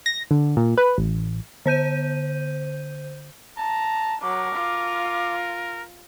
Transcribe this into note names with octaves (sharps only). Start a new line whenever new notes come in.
A#6
D3
A#2
B4
A1
D3 C5 G6 D#7
A5 A#5
F#3 A#4 D6
F4